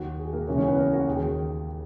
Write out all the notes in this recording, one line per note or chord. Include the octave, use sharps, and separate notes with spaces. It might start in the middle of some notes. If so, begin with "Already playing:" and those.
Already playing: D#2 D#3 F#4
G#4
A#3 A#4
C#2 C#3 E3 C#4 C#5
C#4 C#5
B3 B4
A#3 A#4
F#4
D#2 D#3 G#4